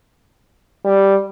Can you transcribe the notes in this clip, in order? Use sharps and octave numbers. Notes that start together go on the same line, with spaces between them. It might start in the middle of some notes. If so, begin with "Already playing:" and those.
G3